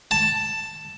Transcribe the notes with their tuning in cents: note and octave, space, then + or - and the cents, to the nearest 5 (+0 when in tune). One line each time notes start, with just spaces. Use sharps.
A5 +5